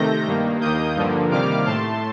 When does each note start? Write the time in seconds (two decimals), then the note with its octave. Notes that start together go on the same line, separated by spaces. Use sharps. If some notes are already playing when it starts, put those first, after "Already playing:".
Already playing: C3 D#3 A3 G6 A#6
0.27 G2 D#3 A#3
0.60 D#2 D#3 A#3 D#6 G6
0.96 G2 D3 F3 A#3
1.31 C3 D#3 G3 A#3 D6 F6
1.66 A2 A3 A5 C6